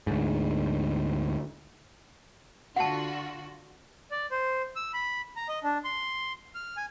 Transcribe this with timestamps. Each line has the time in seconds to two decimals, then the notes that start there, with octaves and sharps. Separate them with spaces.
0.07 D2 G#2
2.76 D3 F4 F#4 F#5 A5
4.11 D5
4.31 C5
4.76 E6
4.93 B5
5.36 A#5
5.48 D#5
5.63 D4
5.84 C6
6.55 F6
6.77 G#5